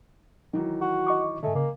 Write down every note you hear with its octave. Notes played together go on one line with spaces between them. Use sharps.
D#3 E3 F#3
F#4
D#5 C#6 D6
G#2 D3 A3 D#5 G#5
C#3 A#3